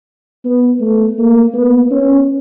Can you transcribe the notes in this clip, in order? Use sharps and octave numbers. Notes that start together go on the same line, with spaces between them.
B3
A3
A#3
B3
C#4